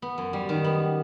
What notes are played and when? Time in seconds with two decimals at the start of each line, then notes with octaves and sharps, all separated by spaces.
0.02 B3
0.18 F#2
0.33 G3
0.49 D#3
0.64 B3